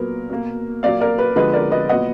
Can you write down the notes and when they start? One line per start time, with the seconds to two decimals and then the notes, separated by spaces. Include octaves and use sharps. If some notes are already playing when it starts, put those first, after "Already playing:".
Already playing: A#2 F#3 B3 A#4
0.30 B2 A#3
0.83 A#2 F#3 A#3 D5 F5
1.00 A#4 D5
1.18 B4
1.36 D3 F3 G#3 B3 B4 D#5
1.53 A#4 D5
1.71 B4 D#5
1.89 A#2 F#3 B3 D#5 F#5